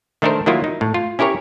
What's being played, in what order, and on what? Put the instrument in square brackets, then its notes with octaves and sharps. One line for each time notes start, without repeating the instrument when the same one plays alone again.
[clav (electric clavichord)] D#3 A3 D4 A4 A#4 C5
D#3 F#3 A#3 E4 F4
D#4
A2
F4
C#4 E4 G4 A#4 C#5